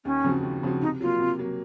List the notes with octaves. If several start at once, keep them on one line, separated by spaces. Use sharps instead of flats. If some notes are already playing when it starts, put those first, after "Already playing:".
D#2 C#4
C#3 F3 C4 F#4
D#2
C#3 F3 C4 F#4
C3 D#4
F#3 A#3 F4
C3
F#3 A#3